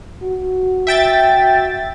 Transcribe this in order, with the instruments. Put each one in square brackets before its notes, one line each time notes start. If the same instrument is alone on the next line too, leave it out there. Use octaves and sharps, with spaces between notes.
[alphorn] F#4
[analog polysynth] E5 G5 A6